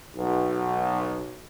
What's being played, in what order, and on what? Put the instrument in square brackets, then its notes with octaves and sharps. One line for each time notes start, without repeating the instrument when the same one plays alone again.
[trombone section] B1